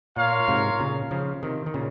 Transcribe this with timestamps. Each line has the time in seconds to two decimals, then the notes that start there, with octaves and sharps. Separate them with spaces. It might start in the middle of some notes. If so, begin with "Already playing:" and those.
0.16 A#2 F4 A#4 C#5 F5
0.48 G#2 C3
0.79 A#2 C#3
1.11 C#3 F3
1.43 C3 D#3
1.66 D#3
1.74 A#2 C#3